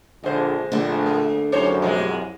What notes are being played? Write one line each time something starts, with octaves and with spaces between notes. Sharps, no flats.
A#1 D3 G#3 C5
A#1 D3 A3
A#3
C2 F#2 C#4 C5 C#5
B2 F3 G#3